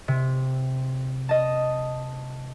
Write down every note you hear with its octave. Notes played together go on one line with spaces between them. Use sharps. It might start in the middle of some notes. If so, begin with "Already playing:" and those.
C3
D#5 A5